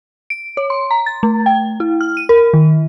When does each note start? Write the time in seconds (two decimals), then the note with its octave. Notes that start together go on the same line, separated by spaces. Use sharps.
0.30 D7
0.57 C#5
0.70 C6
0.91 A#5
1.06 A6
1.23 A3
1.46 G5
1.80 E4
2.01 F6
2.17 D#7
2.29 A#4
2.53 D#3